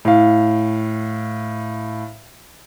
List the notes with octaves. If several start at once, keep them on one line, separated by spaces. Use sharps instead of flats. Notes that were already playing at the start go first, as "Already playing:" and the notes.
A2 F5